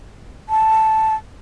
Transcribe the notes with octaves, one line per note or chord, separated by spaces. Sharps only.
A5